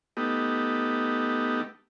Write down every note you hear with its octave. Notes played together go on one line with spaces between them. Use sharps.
A3 B3 D#4 G4